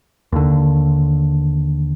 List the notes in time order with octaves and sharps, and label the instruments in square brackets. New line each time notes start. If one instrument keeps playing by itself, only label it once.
[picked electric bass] D#2 D3